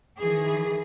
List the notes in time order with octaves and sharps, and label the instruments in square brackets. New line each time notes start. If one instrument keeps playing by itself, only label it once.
[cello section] D#3 E3 G#4